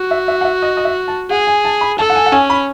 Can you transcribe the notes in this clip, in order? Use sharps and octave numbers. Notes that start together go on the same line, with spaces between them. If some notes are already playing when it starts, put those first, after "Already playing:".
Already playing: F#4
E5
E5
F#5
E5
D#5
D#5
E5
A5
G#4 F#5
G#5
A5
B5
A4 A5
F#5
G#5
F#5
C#4 G#5
B5